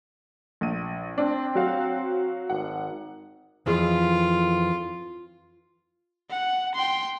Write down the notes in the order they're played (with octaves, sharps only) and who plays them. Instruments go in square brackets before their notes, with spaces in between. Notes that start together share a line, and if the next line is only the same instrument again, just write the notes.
[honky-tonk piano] A#1 D#7
[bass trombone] C4 [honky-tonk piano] D4
[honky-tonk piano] F#3 F#4 F5
[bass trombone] G#1 [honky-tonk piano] F#5
[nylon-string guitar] F2 E3 G#4 [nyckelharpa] F4
[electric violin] F#5
G5 C6